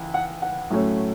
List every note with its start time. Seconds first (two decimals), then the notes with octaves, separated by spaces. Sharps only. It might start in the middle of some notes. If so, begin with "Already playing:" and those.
Already playing: C#2 E3
0.14 F#5
0.42 F#5
0.70 A2 F#3 A3 C#4